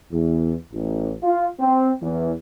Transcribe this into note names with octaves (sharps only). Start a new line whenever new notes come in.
E2
A1
F4
C4
E2